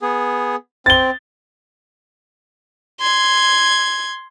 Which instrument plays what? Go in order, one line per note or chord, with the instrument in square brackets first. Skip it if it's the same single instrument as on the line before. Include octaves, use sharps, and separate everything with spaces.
[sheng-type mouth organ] B3 G#4
[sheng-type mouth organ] C4 [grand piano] A6 G7
[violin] C6 G#6